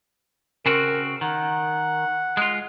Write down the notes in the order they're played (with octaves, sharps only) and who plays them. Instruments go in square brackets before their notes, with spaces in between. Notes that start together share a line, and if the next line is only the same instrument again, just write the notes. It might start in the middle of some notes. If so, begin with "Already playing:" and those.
[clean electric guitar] C#3 C4 F#4 [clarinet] A#4
[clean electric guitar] D#3 [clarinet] F#5
[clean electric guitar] G#3 F4